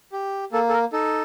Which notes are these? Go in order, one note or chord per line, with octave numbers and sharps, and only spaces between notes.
G4
A#3 A4
A4
A#4
D#4 A4